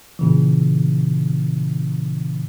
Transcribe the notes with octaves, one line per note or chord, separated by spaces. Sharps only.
A#2 C#3 E3